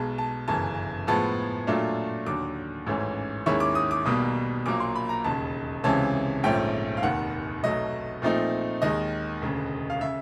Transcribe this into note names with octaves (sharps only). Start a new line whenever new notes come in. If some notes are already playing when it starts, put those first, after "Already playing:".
Already playing: B1 B2 G#3 A5
A5
G1 F#2 C#3 E3 A5
A2 F3 G#3 B3 A5
A#2 F#3 A3 D4 F4
D#2 D3 F#3 D6
A1 G#2 E3 A3 C#4
D#2 D#3 G#3 C#4 E4 C#6
D6
D#6
D6
B1 B2 G3 A#3 D#6
A#1 A#2 F#3 A#3 D6
C6
B5
A#5
E1 D#2 C#3 A5
C#2 C3 E3 G#3 C#4 A5
A#1 G#2 F3 A3 C#4 G5
F5
F1 D#2 D#3 F#5
B1 B2 F#3 A3 D#5
A#2 F3 A3 C4 D#4
D#2 D#3 G#3 D#5
E1 D2 C#3
F5
C#3 E5